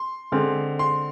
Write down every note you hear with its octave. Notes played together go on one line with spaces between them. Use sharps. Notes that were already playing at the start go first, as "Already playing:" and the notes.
Already playing: C6
D3 G#3 C4
C6